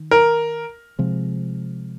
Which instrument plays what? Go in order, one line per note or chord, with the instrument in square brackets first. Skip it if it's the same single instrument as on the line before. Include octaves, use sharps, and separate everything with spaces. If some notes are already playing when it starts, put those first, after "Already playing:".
Already playing: [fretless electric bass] D#3
[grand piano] A#4
[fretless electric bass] C3 F3 G#3 C4